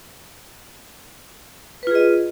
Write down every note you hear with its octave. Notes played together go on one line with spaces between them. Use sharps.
F4 G#4 B4 D#5